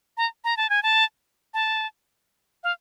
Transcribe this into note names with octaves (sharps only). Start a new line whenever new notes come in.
A#5
A#5
A5
G#5
A5
A5
F5